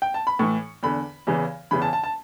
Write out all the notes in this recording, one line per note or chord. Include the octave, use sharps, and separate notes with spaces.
G5
A5
B5
A2 E3 C#6
E2 D3 B5
E2 C#3 E3
E2 C#3 E3 B5
A5
A5
A5